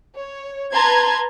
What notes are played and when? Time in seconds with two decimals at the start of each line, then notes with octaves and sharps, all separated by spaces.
0.17 C#5
0.71 B4 A5 A#5 C6 G#6